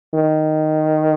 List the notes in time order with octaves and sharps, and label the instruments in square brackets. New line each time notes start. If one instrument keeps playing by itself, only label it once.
[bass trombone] D#3